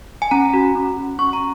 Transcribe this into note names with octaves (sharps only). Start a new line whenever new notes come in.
G#5
C#4 A#5
F#4
C#4
F#4
C#4 C#6
A#5